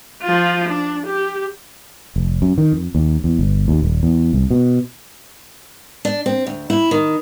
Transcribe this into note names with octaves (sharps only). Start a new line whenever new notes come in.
F3 F4
D4
G4
F1
F#2
D#3
F2
D#2
E2
G1
D#2
D#1
E2
C2
B2
D4
C4
D2
E4
D#3